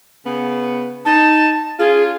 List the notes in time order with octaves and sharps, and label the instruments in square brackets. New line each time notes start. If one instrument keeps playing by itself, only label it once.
[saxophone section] C#3 B3
[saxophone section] D#4 [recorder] A5
[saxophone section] C#4 F4 [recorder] G#4